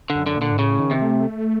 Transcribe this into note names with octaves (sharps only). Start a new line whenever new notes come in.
D3
F#2
D3
A#2 D3
G#2
A2 C#3
D#3
C3
A3